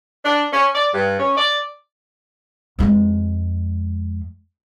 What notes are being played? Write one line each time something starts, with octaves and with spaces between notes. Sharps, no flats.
D4
C#4
D5
G2
C#4
D5
F2 G#3